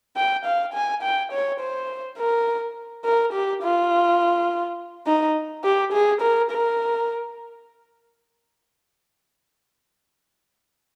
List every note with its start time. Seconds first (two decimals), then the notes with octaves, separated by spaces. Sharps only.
0.17 G5
0.46 F5
0.74 G#5
1.03 G5
1.32 C#5
1.60 C5
2.18 A#4
3.05 A#4
3.33 G4
3.63 F4
5.07 D#4
5.64 G4
5.93 G#4
6.21 A#4
6.51 A#4